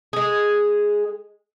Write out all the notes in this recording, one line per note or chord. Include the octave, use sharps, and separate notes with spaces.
G#3 G#4